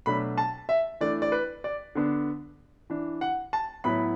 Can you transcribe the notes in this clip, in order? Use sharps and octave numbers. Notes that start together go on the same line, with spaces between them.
B2 F#3 A3 D4 B5
A5
E5
E3 A3 D4 D5
D5
B4
D5
D3 B3 D4
E3 D4
F#5
A5
A2 F#3 B3 E4 B5